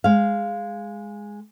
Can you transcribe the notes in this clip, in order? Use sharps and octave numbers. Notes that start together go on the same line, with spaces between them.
G#3 F5